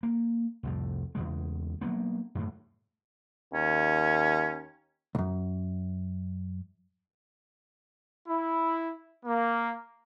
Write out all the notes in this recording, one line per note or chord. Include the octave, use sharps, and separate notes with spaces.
A#3
C2 F2 A2
E2 C#3 G#3
F#3 G3 A#3 B3
F#2 A2
D#2 C#4
C2 F#2
E4
A#3